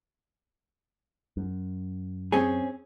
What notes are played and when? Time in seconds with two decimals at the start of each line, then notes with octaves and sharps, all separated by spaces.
1.37 F#2
2.32 C4 C#4 G#4